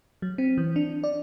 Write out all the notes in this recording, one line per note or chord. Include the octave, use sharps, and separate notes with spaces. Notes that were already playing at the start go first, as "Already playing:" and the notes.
F#3
C4
E3
D4
D5